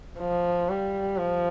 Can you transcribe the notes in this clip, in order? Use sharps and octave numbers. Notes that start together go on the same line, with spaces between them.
F3
G3
F3